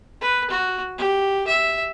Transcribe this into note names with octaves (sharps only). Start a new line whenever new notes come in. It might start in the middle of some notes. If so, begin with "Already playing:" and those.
B4
F#4
G4
E5